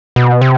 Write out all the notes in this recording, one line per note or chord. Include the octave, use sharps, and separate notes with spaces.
B2
C3